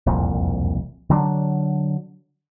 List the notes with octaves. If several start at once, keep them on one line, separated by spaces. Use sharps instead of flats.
E1 C2 F2 A#2
D3 F#3 D4